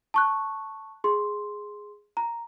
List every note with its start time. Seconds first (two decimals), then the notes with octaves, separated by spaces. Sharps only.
0.14 A5 C#6 F#6
1.04 G#4 C6
2.17 A#5